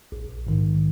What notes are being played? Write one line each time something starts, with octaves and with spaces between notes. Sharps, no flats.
A#1
G#2 D#3